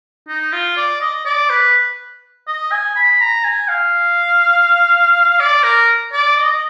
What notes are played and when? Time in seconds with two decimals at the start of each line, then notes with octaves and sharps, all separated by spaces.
0.28 D#4
0.53 F4
0.77 D5
1.01 D#5
1.26 D5
1.50 B4
2.47 D#5
2.72 G#5
2.96 B5
3.21 A#5
3.44 G#5
3.68 F5
5.40 D5
5.63 A#4
6.13 D5
6.37 D#5